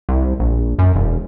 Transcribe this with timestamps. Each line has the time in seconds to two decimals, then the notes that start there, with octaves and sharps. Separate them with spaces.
0.09 C2
0.40 A#1
0.79 F#2
0.95 E1